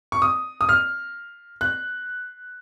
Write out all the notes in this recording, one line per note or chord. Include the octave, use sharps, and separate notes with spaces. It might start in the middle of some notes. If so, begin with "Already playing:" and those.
C#6
D#6
D#6
F6
F#6